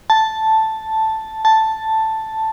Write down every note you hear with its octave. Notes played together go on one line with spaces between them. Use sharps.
A5
A5